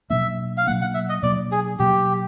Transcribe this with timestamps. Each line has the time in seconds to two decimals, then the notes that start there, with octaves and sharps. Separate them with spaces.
0.10 B2 F#3 A#3 D4 E5
0.57 F5
0.67 B2 F#3 A#3 D4 F#5
0.81 F#5
0.94 E5
1.09 D#5
1.23 B2 F#3 A#3 D4 D5
1.52 G#4
1.79 B2 F#3 A#3 D4 G4